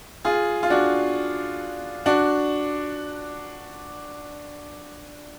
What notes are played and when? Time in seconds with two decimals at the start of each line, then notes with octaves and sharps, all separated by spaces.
0.25 F4 G#4
0.63 F4
0.70 D4 F#4
2.06 D4 F#4